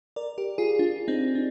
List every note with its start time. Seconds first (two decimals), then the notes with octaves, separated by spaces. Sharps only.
0.16 A#4 D5
0.38 G4 A#4
0.58 F4 G#4
0.79 D4 F4
1.08 C4 D#4
1.35 D4